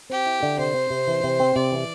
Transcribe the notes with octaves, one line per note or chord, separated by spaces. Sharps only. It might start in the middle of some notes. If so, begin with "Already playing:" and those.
C4 G4
E4
D3
C3 C5
C4
C3
E3
C3
C4
C3 D5
E3